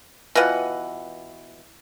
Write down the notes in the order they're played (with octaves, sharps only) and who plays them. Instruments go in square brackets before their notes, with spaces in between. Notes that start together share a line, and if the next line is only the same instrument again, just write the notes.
[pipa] B2 E3 F4 F#5